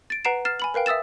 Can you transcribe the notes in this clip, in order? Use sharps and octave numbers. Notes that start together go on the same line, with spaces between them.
A6 D7
B4 F#5 A#5 C7 D7 E7
F6 A6 C7 E7
G#5 B5 F#7
A#4 B4 F5 G5
E5 D#6 E6 A6 E7